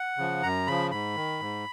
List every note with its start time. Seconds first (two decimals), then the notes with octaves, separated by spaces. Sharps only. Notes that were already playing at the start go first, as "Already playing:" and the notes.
Already playing: F#5
0.18 C#3 F3
0.43 F#2 A#5
0.67 C#3 F3 B5
0.91 G#2 B5
1.16 D#3
1.40 G#2